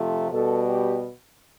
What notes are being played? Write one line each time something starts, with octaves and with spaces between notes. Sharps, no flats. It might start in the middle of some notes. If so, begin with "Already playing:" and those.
Already playing: F2 C3 F3 A3
B2 G3 A4
G4